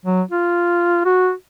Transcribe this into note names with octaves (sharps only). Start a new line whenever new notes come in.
F#3
F4
F#4